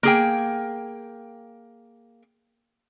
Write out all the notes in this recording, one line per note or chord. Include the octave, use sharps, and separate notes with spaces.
A#3 G#4 G5